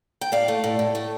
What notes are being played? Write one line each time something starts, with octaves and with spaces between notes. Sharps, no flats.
G5
A2 D5 F5
A3
A2
A2
A3